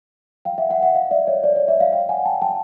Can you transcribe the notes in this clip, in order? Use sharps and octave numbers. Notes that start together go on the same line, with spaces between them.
F5 G5
E5 F#5
E5 F#5
E5 F#5
D#5 F5
D5 E5
C#5 D#5
C5 D5
C#5 D#5
D5 E5
D#5 F5
F5 G5
F#5 G#5
G5 A5
G5 A5